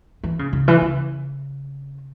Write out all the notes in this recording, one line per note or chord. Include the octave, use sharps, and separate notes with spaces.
E3
C#3
C#3
E3
C#3